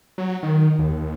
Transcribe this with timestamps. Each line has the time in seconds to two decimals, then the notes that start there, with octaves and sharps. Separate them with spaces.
0.18 F#3
0.43 D#3
0.79 D#2